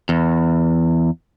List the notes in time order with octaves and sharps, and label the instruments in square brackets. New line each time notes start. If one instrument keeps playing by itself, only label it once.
[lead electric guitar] E2